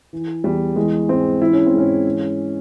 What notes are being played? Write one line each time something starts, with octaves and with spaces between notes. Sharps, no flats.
E3
E2 G3
E3 G#3
G#2 C4
E3 E4
C#4
C4
G#2 C#4
E3